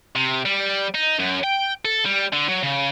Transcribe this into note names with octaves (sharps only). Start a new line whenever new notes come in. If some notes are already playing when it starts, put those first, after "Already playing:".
C3
G3
D#4
F#2
G5
A4
G3
D3
F#3
C#3